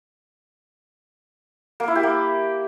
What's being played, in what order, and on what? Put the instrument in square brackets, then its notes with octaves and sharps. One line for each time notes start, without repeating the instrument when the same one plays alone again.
[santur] A#3
E4
G4
A#3